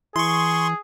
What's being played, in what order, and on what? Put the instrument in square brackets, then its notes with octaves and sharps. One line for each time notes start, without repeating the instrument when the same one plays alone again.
[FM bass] E3 [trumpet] G#4 [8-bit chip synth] C6 C#6